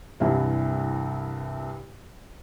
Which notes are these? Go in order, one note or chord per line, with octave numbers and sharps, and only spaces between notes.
C2 G2 E3